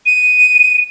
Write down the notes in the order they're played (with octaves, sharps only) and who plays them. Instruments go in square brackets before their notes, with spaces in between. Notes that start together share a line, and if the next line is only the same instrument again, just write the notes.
[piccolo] D#7